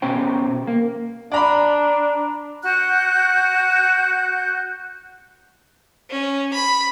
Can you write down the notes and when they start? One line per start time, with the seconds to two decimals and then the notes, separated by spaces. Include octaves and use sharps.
0.02 B2 C#4 C5 G5
0.67 A#3
1.32 D4 D5 A#5 B5
2.63 F#4 F#5 F#6 G6
6.10 C#4
6.53 B5